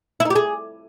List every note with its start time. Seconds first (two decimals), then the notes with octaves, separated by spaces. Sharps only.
0.20 E4
0.25 D#4
0.30 G4
0.35 G#4